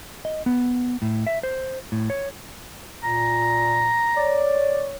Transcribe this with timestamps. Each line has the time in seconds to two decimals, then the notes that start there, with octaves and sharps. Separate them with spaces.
0.25 D#5
0.46 B3
1.02 A2
1.27 E5
1.43 C5
1.92 A2
2.10 C#5
3.03 A#2 A#5
4.17 C#5 D5